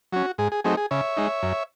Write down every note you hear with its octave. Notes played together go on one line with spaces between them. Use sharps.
F#3 C#4 F#4
G#2 G#4
G#4
F#3 A3 C4 D#4 G#4
G#4
C#3 C#5 E5
G#3 D#4
F#2